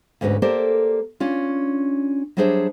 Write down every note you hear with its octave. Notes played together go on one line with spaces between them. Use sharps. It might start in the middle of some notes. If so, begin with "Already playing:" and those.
D2 G#2 C#4 F#4 B4
A#3 G4 A4 A#4 C5 D5
C#4 D4 F4
F#3 G3 D4 G#4 C5 E5